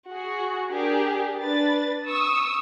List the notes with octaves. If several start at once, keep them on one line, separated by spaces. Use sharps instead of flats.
F#4 G#4
D4 G4 G#4 A#4
D4 B4 A6
C#6 D#6 E6